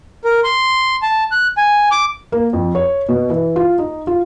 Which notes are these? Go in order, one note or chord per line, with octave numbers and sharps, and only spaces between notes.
A#4
C6
A5
F#6
G#5
D6
A#3
F2
C#5
B2
E3
F4
D#4
F4